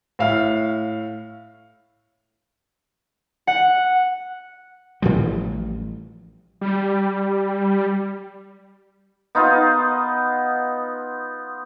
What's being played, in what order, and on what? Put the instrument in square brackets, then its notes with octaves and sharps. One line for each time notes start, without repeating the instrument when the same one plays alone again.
[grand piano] A2 E5 F5
[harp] F#5
[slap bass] A1 A2 F3 G3
[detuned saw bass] G3
[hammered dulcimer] B3 D#4 F4